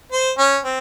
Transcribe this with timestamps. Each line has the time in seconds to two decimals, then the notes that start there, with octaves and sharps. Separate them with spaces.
0.12 C5
0.38 C#4
0.64 C4